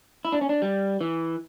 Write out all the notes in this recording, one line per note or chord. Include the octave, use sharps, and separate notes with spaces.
E4
D4
C#4
D4
G3
E3